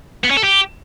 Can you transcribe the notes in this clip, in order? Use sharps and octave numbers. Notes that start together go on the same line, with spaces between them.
B3
C#4
A4
G4